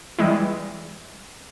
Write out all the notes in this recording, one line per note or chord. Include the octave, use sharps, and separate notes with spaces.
E3 G3 G#3 E4